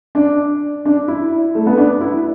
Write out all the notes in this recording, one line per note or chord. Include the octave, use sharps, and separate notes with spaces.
D4
D4
E4
A3
B3
D4
E4